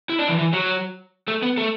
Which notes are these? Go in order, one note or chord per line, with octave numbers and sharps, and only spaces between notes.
E4
D4
E3 E4
E3 E4
F#3 F#4
A3 A4
B3 B4
A3 A4